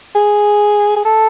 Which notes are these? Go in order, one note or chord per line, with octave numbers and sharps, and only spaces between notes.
G#4
G#4
A4